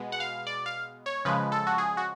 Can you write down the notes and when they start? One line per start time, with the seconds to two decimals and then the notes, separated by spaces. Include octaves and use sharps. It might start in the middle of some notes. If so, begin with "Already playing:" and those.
Already playing: B2 G#3 B3
0.12 F#5
0.20 F5
0.47 D5
0.66 F5
1.06 C#5
1.25 C#3 F3 G#3 B4
1.52 A4
1.67 F#4
1.78 G#4
1.97 F#4